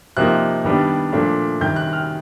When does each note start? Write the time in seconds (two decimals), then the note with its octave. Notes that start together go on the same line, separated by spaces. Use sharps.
0.17 C3 F3 A#3 D#4 F#6
0.64 D#3 G3 B3 D4
1.12 A#2 F3 A3 D4
1.60 C3 D#3 G3 G6
1.76 F#6
1.93 F6